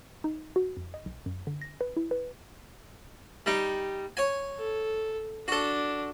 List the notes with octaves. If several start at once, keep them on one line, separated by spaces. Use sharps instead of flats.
D#4
F#4
F2
D#5
B1
F#2
D3
A#6
B4
E4
B4
G3 D#4
C#5 G#5
A4
D4 F#4 A4